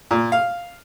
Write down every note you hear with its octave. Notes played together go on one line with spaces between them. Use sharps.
A#2
F5